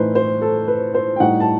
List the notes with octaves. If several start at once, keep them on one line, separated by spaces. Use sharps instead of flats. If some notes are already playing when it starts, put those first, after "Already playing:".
Already playing: A2 E3 A3 D#4 B4 C5
C5
A4
B4
C5
G5
A2 G3 D#4 F#5
A5